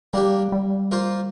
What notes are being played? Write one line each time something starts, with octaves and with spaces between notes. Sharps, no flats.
G3 A#3 D4 G4
G3
A#3 F4 C5